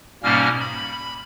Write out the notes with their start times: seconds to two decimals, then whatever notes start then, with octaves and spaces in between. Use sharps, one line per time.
0.23 G#2 B2 G3 A#3 C#4 F6
0.60 B5